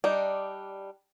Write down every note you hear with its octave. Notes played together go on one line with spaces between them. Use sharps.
G3 D4 D#4 D5